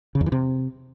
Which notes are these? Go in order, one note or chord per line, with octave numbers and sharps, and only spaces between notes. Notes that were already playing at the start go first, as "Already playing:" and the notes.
C#3
E2
E3
C3